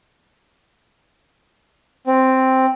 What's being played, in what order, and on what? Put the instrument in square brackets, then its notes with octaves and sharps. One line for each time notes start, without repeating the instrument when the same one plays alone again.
[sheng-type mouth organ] C4